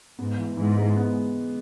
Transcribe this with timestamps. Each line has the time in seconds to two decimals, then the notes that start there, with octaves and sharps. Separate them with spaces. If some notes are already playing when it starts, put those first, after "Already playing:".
0.19 G#2 B3
0.38 E3
0.57 G#2 E3
0.77 G#3
0.96 B3